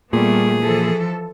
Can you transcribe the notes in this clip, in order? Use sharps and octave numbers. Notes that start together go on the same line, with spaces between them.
A#2 G3 A3 B3 G#4
E3 F3 A4